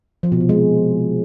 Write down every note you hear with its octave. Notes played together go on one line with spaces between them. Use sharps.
F3
B2
C3
G#3